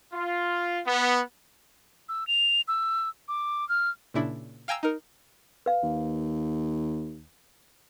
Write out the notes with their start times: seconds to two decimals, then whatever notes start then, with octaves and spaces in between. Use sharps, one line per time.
0.13 F4
0.85 B3
2.09 E6
2.27 F7
2.68 E6
3.28 D6
3.69 F6
4.14 A#2 C#3 D4 E4
4.68 F5 G5 G#5 A#5 E6
4.83 D#4 A#4
5.66 B4 F5
5.83 D#2